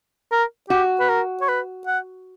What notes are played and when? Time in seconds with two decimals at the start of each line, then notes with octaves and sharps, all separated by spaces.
0.32 A#4
0.70 F#4 G4
1.00 B4
1.09 A#4
1.41 C#5
1.48 B4
1.87 F#5